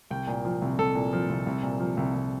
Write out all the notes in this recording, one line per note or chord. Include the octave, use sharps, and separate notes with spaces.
C2 G5
A#2
F3
C2
C2 A4
A#2
F3
C2
C2
A#2
F3
C2
C2